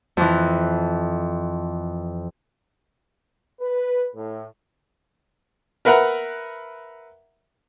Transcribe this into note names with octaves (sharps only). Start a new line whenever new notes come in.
F2 E3
B4
A2
A#4 B4 E5 F#5 A#5